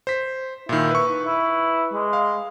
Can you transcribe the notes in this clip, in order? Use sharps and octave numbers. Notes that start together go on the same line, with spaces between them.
C5 B6
A#2 D#3 E4
B4 C#6
E4
G#3
F5